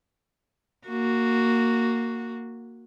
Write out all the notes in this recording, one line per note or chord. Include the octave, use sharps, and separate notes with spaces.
A#3 F#4